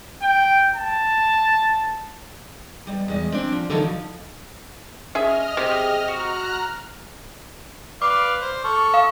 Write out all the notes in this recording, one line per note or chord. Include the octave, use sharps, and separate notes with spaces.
G5
A5
B2 G3
E2 G#3 D#5
C4 D4
F3
D3 E3 F#3 A#3 D#4 A4
F3
C#4 G#4 D#5 E5 F6
C3 G4 G#4
F#4 A#5 F6 F#6
B4 D5 F5 D6
C5
A4 C#6 F6
F5